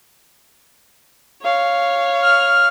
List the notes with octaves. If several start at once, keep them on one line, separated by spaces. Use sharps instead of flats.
C#5 F5
F6